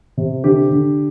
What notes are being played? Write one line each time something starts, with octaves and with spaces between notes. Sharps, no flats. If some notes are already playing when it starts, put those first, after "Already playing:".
C3
D3 G4
D3